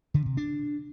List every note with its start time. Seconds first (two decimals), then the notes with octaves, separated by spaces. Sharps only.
0.14 D3
0.26 C3
0.37 D4